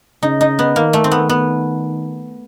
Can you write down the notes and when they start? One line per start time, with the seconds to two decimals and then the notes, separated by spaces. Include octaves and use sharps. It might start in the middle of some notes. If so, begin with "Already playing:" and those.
0.23 C#3 D#4
0.41 D#4
0.59 B3
0.76 D#3 A#3
0.93 A3
1.04 C4
1.12 B3
1.29 B3